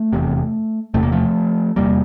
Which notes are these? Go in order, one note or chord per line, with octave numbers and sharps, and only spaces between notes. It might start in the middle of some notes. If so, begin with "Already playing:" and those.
Already playing: A3
F1 E2 C3
F1 E2 C3 A3
A#3
F3 A3
F1 E2 C3 G3 A#3